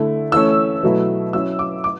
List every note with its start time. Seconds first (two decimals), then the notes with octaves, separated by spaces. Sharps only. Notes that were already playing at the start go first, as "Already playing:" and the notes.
Already playing: D3 A3 E4
0.32 E3 A3 C#4 E6
0.83 B2 F#3 A3 E4
1.33 F#3 C#4 E4 E6
1.59 D6
1.84 D6